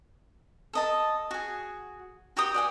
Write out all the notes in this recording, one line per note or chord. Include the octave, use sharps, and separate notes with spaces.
A4 D#5 A5
F#4 G#4
F#4 G4 G5 D#6
D5 F#5 G#5